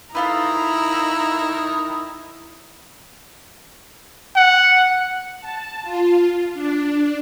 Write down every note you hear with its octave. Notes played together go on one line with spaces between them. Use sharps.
D#3 A3 E4 F4 B4 A#5 D#6
F#5
A5
F4
D4